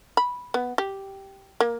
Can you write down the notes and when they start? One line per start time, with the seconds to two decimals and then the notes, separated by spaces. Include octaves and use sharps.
0.17 B5
0.54 B3
0.78 G4
1.60 A#3